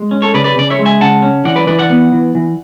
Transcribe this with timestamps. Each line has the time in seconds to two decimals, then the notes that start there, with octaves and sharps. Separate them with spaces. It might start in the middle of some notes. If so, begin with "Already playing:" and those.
Already playing: G#3
0.11 C#4
0.22 A4 C#5
0.34 C#3 B4 D5
0.44 B4 D5
0.57 C#3 D5
0.70 C#5 E5
0.79 G#3
0.85 E5 G#5
1.01 C#3 F#5 A5
1.22 C#4
1.45 E3 D5 F#5
1.56 B4 D5
1.66 E3 B4 D5
1.79 D5 F#5
1.90 B3
2.12 E3
2.35 E3